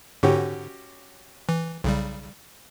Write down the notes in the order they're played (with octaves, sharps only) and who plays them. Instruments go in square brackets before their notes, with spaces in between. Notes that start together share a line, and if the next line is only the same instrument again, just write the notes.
[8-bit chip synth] G#2 D3 [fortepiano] C#4 F#4 G4
[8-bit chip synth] E3
B1 C#3 G3